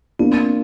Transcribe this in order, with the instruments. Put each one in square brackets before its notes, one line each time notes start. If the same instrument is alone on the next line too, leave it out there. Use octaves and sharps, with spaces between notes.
[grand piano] A#3 D4 F4 [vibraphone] B3
[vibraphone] C4